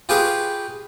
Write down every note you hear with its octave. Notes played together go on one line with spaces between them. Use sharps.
F4 G4 G#4 B4 F5 C#6